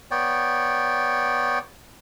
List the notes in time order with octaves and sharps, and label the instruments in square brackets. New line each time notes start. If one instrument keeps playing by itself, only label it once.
[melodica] B3 C#5 D5 G5